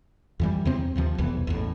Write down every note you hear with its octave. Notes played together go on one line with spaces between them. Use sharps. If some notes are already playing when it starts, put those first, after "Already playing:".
F2 E3 G3
E2 C3 C4
D#2 C3 F3
F1 B1 E2 E3
A1 E2 A2